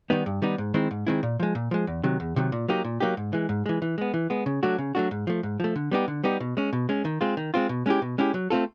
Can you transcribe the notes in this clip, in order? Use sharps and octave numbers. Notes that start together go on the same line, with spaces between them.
D#3 G3 B3 D#4
G2
D#3 G3 B3 D#4
G#2
D#3 G#3 C4 E4
G#2
D#3 G#3 C4 E4
A#2
F3 G#3
A#2
F3 G#3
E2
C3 D#3 F#3
E2
C3 D#3 F#3
A#2
F#3 A#3 D#4 G4
A#2
F#3 A#3 D#4 G4
G#2
E3 G#3
G#2
E3 G#3
E3
G#3 B3
E3
G#3 B3
C#3
F#3 A3 D4 F#4
C#3
F#3 A3 D4 F#4
G#2
F3 A3
G#2
F3 A3
D3
G3 B3 D#4 G4
D3
G3 B3 D#4 G4
B2
G#3 C#4
B2
G#3 C#4
D#3
G#3 C4 F4
D#3
G#3 C4 F4
B2
G#3 C#4 E4 G4
B2
G#3 C#4 E4 G4
F#3
A3 C4 F4 A4